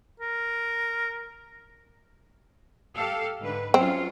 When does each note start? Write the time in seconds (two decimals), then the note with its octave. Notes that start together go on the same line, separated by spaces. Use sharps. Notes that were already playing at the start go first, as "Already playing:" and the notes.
0.20 A#4
2.95 G4 A4 F5
3.40 G#2 D3 B4
3.74 F#3 C4 C#4 F4